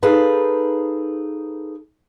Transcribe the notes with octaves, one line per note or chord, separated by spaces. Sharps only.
D#4 G#4 A4 B4 C5 F5